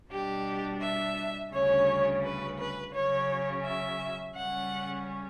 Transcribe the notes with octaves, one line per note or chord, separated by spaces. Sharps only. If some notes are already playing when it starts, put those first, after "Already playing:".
B2 G3 D4 G4
E5
D2 C#3 G3 C#4 C#5
B4
B4
C#3 F#3 C#4 C#5
E5
C#3 G3 C#4 F#5